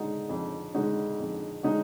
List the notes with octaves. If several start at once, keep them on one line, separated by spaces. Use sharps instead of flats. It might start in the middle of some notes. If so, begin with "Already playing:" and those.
Already playing: D3 G#3 D#4 F#4
F2
D3 G#3 D#4 F#4
F2
D3 G#3 D#4 F#4